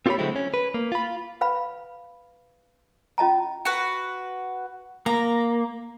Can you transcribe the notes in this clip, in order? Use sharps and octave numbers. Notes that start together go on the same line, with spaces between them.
C4 F4 G4 A4 C#5 B5
D3 F#3 G#3 A3 C4 E4
C#4
B4
A#3
F4 B5
B4 F5 B5
C#4 F4 D#5 A5 A#5
F#4 B4
A#3 A#5